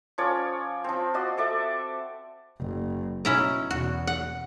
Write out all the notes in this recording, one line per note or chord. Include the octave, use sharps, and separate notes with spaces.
F3 C#4 C#5 D5
F3 C4
F#4 D5 D#5 C6
A4 D5 E5
F#1
B2 C#4 E4 A#5
E2 B2 F#4
F#5